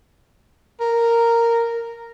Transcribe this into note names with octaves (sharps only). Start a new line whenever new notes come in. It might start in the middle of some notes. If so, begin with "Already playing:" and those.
A#4